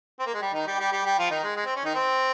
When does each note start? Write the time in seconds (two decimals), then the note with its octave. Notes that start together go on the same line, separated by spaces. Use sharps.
0.20 C4
0.26 A#3
0.34 G#3
0.41 G3
0.54 D#3 D#4
0.67 G3 G4
0.79 G3 G4
0.92 G3 G4
1.05 G3 G4
1.19 F3 F4
1.30 D#3 D#4
1.44 G#3
1.56 G#3
1.66 C4
1.76 C#4
1.85 D#3 D#4
1.95 C4